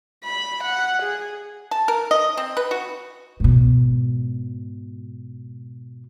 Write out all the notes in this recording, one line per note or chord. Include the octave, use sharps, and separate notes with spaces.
B5
F#5
G#4
A5
A#4
D#5
C4
B4
F#4
G#2 B2